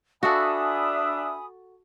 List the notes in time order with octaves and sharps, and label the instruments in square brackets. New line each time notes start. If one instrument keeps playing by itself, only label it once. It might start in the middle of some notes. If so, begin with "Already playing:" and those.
[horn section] D4 E5 [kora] F#4 A4 [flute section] G#5 B5 D#6